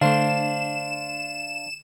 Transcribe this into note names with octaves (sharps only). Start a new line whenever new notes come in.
D3 A3 D4 C5 F5 E7